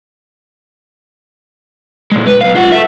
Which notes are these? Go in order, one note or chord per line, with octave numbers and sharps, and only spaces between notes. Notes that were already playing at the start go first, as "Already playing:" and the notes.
A#2 G#3
B4
B1 F5
F4 F#5
A4 E5